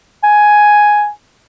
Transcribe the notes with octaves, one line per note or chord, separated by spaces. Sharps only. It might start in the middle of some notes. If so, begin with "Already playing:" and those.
G#5